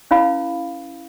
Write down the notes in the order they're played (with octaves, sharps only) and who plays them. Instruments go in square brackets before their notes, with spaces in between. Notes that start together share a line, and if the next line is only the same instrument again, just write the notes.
[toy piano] C#4 E4 B4 F5 B5